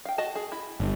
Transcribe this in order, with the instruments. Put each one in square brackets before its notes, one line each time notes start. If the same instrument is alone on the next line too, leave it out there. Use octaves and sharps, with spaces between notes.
[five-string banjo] F5 G5
F#4 D#5 A5
G#4
E4
[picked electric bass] G1